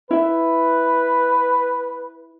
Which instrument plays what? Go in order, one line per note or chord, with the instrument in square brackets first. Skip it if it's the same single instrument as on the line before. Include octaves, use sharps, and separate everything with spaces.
[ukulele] E4 E5 [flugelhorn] B4